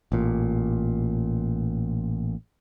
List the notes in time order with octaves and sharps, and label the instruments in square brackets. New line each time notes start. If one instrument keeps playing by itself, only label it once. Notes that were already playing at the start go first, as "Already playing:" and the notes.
[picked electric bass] A1 A#2